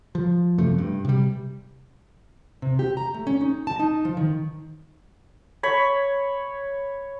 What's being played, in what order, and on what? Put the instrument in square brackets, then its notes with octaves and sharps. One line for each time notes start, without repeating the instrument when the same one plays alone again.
[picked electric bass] F3
F#2 C3 F3 A3
G2
C3 G3
[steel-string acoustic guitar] C3
G4
A#5
A3
C#4
D#4
A5
D#4
F3
D#3
[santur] C#5 B5